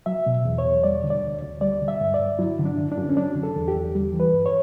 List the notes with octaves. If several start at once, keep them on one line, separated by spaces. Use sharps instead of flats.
F#3 E5
B2
E2
C#5
E2
G3 D5
D3
D5
D2
D2
G3 D5
D3
E5
G2
D5
G2
F#3 E4
D3
D4
F#2
D4
F#2
C#4
F#3 D4
D3
A4
E2
G4
E2
G3
E3
B4
G2
C#5